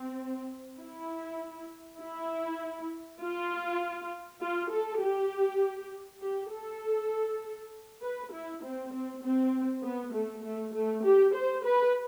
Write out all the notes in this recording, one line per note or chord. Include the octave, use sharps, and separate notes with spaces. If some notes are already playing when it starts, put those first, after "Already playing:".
Already playing: C4
E4
E4
F4
F4
A4
G4
G4
A4
B4
E4
C4
C4
C4
B3
A3
A3
A3
G4
C5
B4